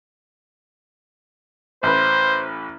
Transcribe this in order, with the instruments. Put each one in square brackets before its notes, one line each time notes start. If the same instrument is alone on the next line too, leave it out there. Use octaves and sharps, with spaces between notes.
[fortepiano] A1 B4 [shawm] C5